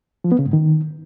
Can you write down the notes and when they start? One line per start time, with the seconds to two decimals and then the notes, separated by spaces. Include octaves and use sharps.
0.24 F3
0.32 B3
0.39 C#3
0.46 G#2
0.53 D#3